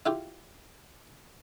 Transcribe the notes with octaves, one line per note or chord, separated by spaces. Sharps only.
E4 F4 G4